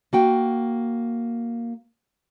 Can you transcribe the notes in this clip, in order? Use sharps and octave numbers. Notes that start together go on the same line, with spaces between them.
A#3 F#4 G5